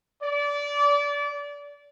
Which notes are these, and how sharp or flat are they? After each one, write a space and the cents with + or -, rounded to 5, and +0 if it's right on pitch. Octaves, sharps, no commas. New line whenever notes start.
D5 -25